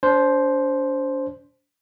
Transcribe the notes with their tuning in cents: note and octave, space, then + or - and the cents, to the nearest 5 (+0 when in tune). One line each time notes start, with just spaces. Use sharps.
D4 -40 C5 +0